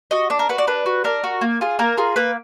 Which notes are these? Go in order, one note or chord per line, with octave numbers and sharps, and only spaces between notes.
F#4 D#5
D4 D5
A#4
F#4 B4
D5
D4 B4
F#4
D4 A#4
F#4
A#3
F4 G#4
A#3 A#4
F4 G#4
A#3 B4